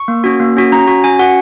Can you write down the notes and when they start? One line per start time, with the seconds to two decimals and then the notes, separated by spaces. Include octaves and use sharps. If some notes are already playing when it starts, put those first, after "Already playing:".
Already playing: C#6
0.08 A#3
0.24 C#4 F#4
0.40 A#3
0.57 C#4 F#4
0.72 C#4 A#5
0.88 F#4
1.04 C#4 G#5
1.19 F#4 F#5